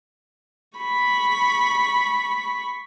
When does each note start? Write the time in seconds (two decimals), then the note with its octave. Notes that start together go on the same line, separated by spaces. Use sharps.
0.77 B5 C#6